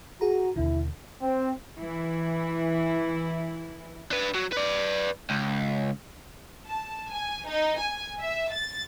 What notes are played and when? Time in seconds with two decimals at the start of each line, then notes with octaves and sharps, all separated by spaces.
0.21 F#4 G#4 A#5
0.56 D#2 B2 D3 E4
1.22 C4
1.78 E3 E4
4.11 D4 B4
4.35 F#3
4.53 B4 D5
5.30 C#2
6.67 A5
7.09 G#5
7.48 D#4
7.79 G#5
8.21 E5
8.52 A6